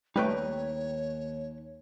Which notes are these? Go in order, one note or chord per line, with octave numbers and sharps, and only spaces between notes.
D#2 G3 A3 D#4 B4 C#5 G5